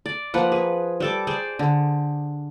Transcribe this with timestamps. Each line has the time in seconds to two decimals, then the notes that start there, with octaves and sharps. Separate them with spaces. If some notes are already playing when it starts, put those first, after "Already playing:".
0.06 D5
0.34 F3 A#3 B4 F#5
0.52 G#4 B4
1.00 G3 A4 D6
1.27 G#4 C5 D5
1.59 D3